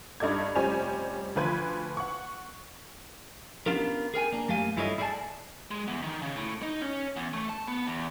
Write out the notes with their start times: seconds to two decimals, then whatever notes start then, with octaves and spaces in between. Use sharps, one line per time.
0.20 G2 D#4 A4 D5 G#6
0.55 F1 G3 C#4 C5 G#5 F7
1.36 D2 F3 B4 C6 G#6
1.97 F#5 C#6
3.66 B3 C#4 D4 F4 G4 A#4
4.14 G#4 A#4 G5 G#5
4.32 A#3 D4
4.48 F#2 A3 G4 F5 G#5
4.77 G2 E4 F4 A4 C#5 D#5
4.98 E4 G#4 D5 D#5 G#5 A5
5.71 G#3
5.88 E2
6.03 D#3
6.22 C#3
6.36 A2
6.62 D#4
6.82 C#4
7.16 E2
7.33 A3
7.49 A5
7.67 B3
7.87 E2